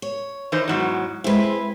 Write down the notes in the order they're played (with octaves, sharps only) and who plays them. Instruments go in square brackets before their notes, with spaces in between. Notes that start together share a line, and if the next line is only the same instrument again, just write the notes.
[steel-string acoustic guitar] C#5
[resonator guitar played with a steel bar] E3 D#4 C5
E2 G#2 F#3
[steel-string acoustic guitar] G#3 C4 [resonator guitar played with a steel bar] E4 B4